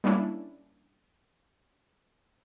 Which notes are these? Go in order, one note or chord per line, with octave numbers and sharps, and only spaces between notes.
G3 A#3 C#4 D4 E4